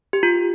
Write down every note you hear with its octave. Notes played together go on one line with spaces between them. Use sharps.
G4
F4